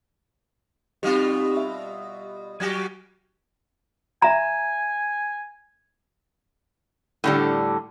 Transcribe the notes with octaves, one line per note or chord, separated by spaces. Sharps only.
B2 G3 C4 D#4 F4 G4
E5
F#3 F#4 G4 G#6
E5 G#5 A#5
A2 D3 G3